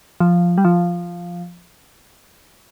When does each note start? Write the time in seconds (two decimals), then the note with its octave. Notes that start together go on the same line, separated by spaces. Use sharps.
0.20 F3
0.58 G3
0.65 F3